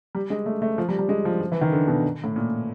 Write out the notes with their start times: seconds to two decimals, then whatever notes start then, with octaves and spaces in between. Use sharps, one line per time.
0.15 G3
0.30 G#3
0.46 A3
0.62 A3
0.78 F3
0.89 G3
0.99 G3
1.09 G#3
1.25 F3
1.41 F3
1.52 E3
1.61 D#3
1.72 D3
1.88 B2
2.24 A2
2.36 A#2